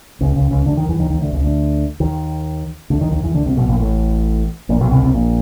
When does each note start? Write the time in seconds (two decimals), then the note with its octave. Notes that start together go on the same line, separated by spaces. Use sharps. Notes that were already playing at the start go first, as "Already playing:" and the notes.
0.21 C#2 C#3
0.36 C#2 C#3
0.51 C#2 C#3
0.66 D2 D3
0.77 D#2 D#3
0.89 E2 E3
0.99 D#2 D#3
1.10 D#2 D#3
1.21 D2 D3
1.33 C#2 C#3
1.44 D2 D3
2.00 D#2 D#3
2.90 D2 D3
3.01 D#2 D#3
3.12 D#2 D#3
3.23 E2 E3
3.35 D2 D3
3.46 C2 C3
3.57 B1 B2
3.69 A#1 A#2
3.79 A1 A2
4.69 A#1 A#2
4.81 B1 B2
4.91 C2 C3
5.03 C2 C3
5.14 A#1 A#2